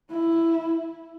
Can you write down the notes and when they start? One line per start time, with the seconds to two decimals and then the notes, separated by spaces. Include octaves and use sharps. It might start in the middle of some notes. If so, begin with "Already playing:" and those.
0.11 E4